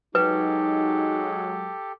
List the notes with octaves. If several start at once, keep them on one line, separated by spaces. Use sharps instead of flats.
F#3 G#3 D#4 G4 A4 B4